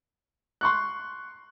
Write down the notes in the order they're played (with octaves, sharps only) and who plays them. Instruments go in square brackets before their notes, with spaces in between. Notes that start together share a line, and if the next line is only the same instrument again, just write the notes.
[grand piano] C6 C#6 F#6